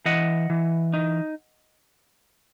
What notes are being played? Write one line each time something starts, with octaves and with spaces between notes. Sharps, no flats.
E3 D#5 F#5
E3
D#4